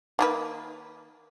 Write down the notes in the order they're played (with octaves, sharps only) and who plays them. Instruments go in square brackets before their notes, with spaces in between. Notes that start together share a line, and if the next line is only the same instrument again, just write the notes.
[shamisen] D#3 A#3 B4